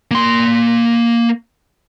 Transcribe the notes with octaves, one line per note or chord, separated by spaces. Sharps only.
A#3 C6